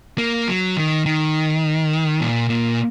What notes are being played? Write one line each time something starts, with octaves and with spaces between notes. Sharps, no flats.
A#3
F#3
D#3
D#3
A#2
A#2